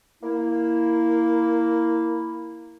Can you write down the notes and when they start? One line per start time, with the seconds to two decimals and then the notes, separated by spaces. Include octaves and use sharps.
0.22 A#3 E4